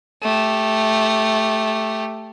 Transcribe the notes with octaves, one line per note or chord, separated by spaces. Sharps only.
A3 G4